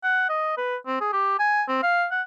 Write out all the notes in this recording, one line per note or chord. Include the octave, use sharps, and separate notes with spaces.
F#5
D#5
B4
C4
G#4
G4
G#5
C4
F5
F#5